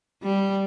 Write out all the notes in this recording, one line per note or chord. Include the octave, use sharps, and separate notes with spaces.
G3